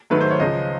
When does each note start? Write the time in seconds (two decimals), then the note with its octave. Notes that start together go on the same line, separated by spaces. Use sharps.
0.10 G#2 D#3 F#3 A3 B4
0.21 C5
0.31 C#5
0.40 C#2 C#3 F3 D#5